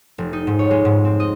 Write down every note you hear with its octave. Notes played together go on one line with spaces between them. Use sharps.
F1
D#4
G#2
C#5
G#3
G#2
C4
D#5